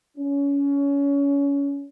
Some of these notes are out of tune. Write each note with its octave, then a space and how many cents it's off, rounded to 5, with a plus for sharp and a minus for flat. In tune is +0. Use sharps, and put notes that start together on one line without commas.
C#4 +25